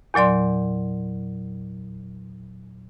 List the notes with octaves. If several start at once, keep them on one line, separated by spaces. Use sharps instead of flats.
E2 A#2 F#3 D5 C6